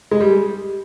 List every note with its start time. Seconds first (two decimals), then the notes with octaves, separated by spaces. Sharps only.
0.11 G#3
0.20 G3